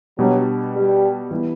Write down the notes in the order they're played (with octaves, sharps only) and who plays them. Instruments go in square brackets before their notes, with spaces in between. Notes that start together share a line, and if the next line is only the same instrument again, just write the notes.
[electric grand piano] B2 G3 D4 [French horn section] F#3
[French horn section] G3
[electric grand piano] E3 G3 B3 E4